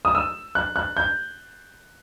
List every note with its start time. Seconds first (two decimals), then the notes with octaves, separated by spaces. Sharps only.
0.05 D#6
0.15 E6
0.55 F#6
0.76 F#6
0.97 G6